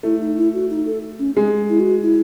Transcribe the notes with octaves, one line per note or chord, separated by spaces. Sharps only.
A3 E4
D#4
E4
F#4
D#4
A4
C#4
G#3 G#4
E4
F#4
E4